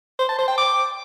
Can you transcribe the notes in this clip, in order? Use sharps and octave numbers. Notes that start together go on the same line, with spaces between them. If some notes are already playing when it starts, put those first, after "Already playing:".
C5
A5
C5
G5
D6